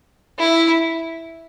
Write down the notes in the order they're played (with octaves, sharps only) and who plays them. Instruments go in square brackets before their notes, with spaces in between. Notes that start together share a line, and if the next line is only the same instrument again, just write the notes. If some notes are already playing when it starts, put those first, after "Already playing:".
[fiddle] E4